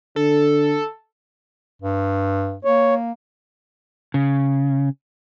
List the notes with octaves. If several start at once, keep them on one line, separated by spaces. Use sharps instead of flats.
D3 A4
G2
A#3 C#5
C#3